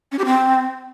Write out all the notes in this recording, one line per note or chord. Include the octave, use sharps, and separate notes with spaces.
C#4
G4
C4